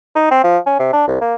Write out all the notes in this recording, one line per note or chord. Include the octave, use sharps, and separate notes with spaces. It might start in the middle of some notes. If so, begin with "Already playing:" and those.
D#4
C4
F3
C#4
C3
D4
C2
A#3